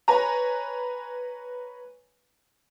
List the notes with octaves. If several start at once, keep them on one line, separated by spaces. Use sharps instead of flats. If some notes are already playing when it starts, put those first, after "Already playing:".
B4 C#5 G#5 A#5